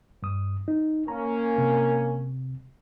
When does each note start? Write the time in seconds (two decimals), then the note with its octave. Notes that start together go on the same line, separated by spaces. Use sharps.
0.23 G2 D#6
0.68 D#4
1.08 A#3 C#4 A#5
1.58 C3